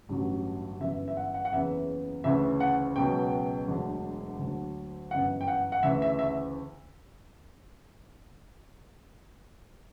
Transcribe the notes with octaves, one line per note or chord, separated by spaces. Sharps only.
A1 G2 D3 F#3
G1 F#2 E3 E5
E5
F#5
F#5
F#5
F#1 E2 C#3 E3 E5
D2 C#3 E3 E5
F#5
C#2 B2 F#3 G5
E1 D2 D3 F#3
D2 D3 F#3
G1 F#2 E3 F#5
G5
F#5
F#5
D2 C#3 E3 E5
E5
E5